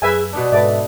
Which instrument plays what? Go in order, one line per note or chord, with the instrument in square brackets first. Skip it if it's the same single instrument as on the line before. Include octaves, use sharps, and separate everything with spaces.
[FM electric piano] F#2 [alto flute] G#4 [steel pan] B4 E5 G#5
[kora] B2 B3 D4 [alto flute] D5
[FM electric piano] G#2 A4 B4 [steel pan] D5 [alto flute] E5